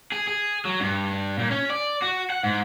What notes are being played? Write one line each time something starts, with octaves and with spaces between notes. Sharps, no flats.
G#4
G#4
F#3
G2
A#2
C#4
D5
F#4
F#5
G#2